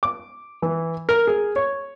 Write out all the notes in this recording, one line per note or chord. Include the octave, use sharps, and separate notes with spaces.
D6
E3
A#4
G#4
C#5